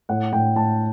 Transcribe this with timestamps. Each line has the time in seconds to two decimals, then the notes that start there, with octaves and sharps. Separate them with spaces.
0.09 A2 F#5
0.33 A2 G5
0.56 A2 A5